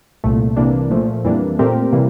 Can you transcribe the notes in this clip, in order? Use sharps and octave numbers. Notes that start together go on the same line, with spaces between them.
C2 A#2 A3
C2 C3 E3 A#3 D4
A#2 F3 A3
F2 E3 G3 A#3 D4
A#2 A3 C4 G4 A#4
C3 E3 G3 A#3